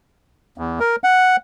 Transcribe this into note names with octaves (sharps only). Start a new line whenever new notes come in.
E2
A#4
F#5